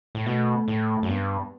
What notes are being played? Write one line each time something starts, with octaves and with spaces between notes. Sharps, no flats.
A2
B2 A3
A2
F#2
G2 B3